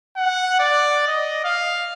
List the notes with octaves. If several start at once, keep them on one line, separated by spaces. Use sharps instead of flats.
F#5
D5
D#5
F5